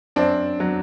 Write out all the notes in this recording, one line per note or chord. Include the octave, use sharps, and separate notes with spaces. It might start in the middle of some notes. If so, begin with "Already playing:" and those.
F#2 C4 D4
F#3